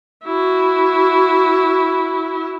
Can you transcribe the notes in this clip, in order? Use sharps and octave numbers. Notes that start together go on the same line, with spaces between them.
E4 F#4